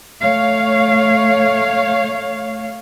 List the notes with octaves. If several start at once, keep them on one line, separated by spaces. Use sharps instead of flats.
A3 C#5 F5